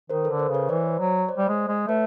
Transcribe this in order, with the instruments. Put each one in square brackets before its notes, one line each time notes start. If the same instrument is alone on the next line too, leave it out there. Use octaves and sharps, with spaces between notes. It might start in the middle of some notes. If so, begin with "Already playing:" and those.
[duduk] D#3 [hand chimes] A#4 C5
[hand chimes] A4 B4
[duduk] D3
[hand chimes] A#4 C5
[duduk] C#3
[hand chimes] B4 C#5
[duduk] E3 [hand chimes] C5 D5
[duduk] F#3
[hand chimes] C#5
C5 D5
[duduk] G3
G#3
G#3
[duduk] A3 [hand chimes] B4 C#5